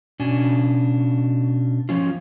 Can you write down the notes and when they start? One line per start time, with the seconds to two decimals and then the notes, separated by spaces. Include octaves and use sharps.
0.20 B2 C#4 D4 G#5
1.89 F3 C#4 F4